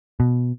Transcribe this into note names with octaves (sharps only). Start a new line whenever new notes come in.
B2